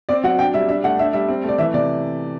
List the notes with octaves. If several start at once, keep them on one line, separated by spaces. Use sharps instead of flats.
C4 D5
F#3 F#5
D4 G5
G3 E5
D4 E5
A3 F#5
D4 E5
G3 E5
C4
A3
D5
E3 E5
C3 D5